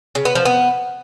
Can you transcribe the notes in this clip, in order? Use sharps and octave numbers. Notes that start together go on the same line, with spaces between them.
C#3
B3
F3
B3